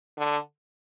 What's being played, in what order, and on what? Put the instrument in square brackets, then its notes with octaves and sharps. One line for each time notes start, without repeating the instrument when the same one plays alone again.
[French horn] D3